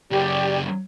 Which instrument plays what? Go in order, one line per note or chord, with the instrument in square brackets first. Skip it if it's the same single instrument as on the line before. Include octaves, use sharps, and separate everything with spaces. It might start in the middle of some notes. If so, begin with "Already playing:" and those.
[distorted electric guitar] F#2 C#3 [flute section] G4 D5